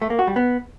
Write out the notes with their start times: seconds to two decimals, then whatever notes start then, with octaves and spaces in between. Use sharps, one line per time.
0.02 A3
0.10 A#3
0.19 F#4
0.27 G3
0.36 B3